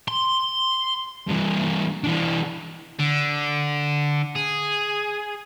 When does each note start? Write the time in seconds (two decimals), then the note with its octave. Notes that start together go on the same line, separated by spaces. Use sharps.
0.08 C6
1.27 G2 E3
2.04 E3 D4
2.99 D3
4.35 G#4